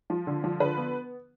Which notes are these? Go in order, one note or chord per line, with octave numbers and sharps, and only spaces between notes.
F3
D3
F3
D3 B4
B3